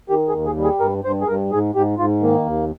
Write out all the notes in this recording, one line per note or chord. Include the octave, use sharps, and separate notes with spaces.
D#3 G4
G#4
D#2
G#4
G3
G#4
G2 A#4
G2 C5
G#4
G2 A#4
G#2 G#4
G#2 G4
G#2 F4
D#3 A#3
D#2